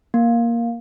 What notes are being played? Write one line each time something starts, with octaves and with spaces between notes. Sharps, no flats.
A#3